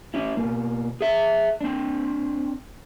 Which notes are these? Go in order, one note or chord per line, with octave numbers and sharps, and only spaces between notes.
C#4 E4
B2 A#3
G#4 E5
C4 D4